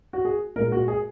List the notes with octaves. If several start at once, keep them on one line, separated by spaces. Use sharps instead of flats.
F#4
G#4
A#2 G#3 A#4
F#4
G#4